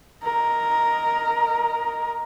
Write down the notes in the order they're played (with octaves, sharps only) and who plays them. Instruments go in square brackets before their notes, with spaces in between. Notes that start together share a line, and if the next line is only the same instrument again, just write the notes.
[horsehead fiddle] A#4 D#5